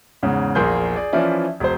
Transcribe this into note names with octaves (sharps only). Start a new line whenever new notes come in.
E2 G#2 C#3
A#1 E2 A#3 G#4 C6 G6
G#4 D5
E3 F3 C#4 E4 D5
E1 C5